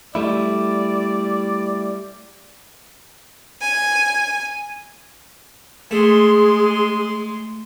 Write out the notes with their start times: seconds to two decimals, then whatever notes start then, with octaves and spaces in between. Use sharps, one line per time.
0.15 G3 A3 E4 D5
3.62 G#5
5.91 G#3 A3 G#4 C6